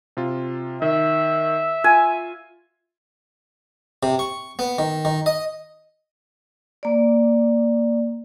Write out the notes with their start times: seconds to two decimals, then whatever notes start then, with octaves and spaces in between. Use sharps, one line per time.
0.17 C3 F4
0.82 D#3 E5
1.84 F4 G#5
4.03 C3
4.19 C#6
4.59 B3
4.78 D#3
5.05 D#3
5.26 D#5
6.83 A#3 D5